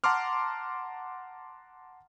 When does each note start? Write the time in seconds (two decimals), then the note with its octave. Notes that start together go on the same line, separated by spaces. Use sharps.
0.04 F#5 A5 A#5 C6 D6 F6